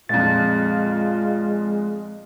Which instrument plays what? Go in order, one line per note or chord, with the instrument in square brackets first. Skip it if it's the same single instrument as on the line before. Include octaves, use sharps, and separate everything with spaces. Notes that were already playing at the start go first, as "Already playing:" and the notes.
[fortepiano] F2 A#2 [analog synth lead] G#3 [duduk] F4 [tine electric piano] A6